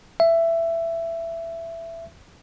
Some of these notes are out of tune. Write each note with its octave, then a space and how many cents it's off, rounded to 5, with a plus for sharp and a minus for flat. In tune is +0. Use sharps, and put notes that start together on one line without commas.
E5 +15